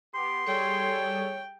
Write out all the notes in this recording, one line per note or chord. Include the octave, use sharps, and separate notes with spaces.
B3 G4 C6
G3 G#4 A4 C#5 G5